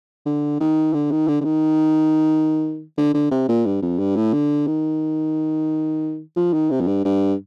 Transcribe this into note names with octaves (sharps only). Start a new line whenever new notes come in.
D3
D#3
D3
D#3
D3
D3
D#3
D3
D3
C3
A#2
G2
F2
G2
A2
D3
D#3
F3
D#3
C3
F2
G2
G2